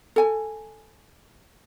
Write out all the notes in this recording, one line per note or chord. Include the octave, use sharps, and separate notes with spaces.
A4 G#5